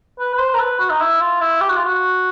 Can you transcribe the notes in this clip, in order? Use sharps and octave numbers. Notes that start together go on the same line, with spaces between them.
B4
B4
C5
A#4
B4
F#4
D#4
E4
F4
E4
G4
F#4
F4
F#4